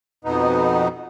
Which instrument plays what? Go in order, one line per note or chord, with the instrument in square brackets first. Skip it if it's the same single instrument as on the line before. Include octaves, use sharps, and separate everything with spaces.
[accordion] F2 B2 B3 D#4